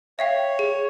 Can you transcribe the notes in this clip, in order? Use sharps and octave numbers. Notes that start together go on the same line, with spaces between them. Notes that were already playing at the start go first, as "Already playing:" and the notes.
C#5 E5 F5 G5
G#4